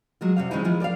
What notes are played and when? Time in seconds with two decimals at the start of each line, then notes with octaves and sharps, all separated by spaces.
0.21 F#3 G#3 F4
0.37 C3 G3 F5
0.51 D#3 G#3 C4 C#4 D#4 E4
0.64 D#3 F3 G#3 E4 F4
0.80 A#4 D5 D#5 F5